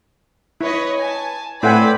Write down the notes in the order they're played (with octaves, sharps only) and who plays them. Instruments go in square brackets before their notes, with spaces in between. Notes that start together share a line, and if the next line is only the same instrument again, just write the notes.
[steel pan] E4 [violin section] B4 C#5 D#5
[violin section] G#5 A5
[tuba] A2 [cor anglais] C4 [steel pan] E4 F#5 G#5 [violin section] B4 D5 B5